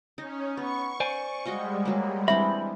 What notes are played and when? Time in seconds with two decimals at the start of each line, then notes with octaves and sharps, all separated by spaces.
0.18 C#4 D#4
0.57 B3 C#6
1.00 C5 D5 G#5
1.45 G3 G#3 F#4 D#5 F5
1.85 F#3 A#3
2.28 E3 C4 D4 E5 B5